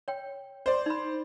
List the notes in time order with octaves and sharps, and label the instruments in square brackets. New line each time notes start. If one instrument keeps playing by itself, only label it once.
[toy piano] C#5 G5
[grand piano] C5 D5
[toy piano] D#4 B5